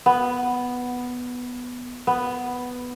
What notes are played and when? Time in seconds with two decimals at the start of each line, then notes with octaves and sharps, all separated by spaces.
0.06 B3
2.07 B3